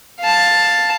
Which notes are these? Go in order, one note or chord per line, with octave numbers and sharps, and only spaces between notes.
F5 A5